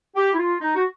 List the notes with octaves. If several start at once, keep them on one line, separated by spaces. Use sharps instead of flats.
G4
E4
F4
D#4
F#4